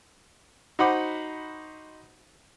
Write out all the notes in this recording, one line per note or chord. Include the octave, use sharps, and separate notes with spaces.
D#4 F#4 C5 F#5 B5 D6